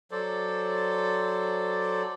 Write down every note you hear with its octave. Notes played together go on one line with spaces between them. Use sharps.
F#3 A4 C5 D5